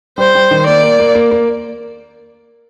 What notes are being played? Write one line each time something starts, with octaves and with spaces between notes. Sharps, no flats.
G3 C5
G3
D#3
A#3 D5
A#3
A#3
A#3
A#3